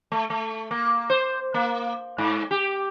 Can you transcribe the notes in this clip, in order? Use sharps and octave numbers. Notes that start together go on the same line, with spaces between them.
A3
A3
A#3
C5
A#3
G#2
G4